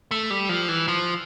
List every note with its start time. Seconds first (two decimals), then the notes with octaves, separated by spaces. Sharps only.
0.11 A3
0.30 G3
0.49 F3
0.68 E3
0.88 F3